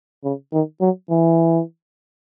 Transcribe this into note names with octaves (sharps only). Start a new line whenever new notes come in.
C#3
D#3
F#3
E3